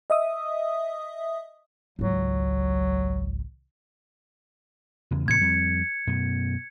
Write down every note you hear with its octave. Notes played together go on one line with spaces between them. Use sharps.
D#5 E5 D#6
G#1 C#2 F#3
E2 C#3 E3
A2 C3 E3 G#6 C#7
F2 G3 C4
F#2 B2 B3